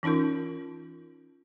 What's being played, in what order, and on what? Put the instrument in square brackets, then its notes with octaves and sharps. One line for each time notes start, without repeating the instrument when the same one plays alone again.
[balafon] E3 C#4 D#4 F4 A#4